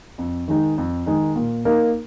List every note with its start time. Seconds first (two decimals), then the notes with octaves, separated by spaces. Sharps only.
0.18 F2
0.48 D#3 G#3 D#4
0.78 F2
1.06 D#3 G#3 D#4
1.36 A#2
1.65 A#3 D#4 A#4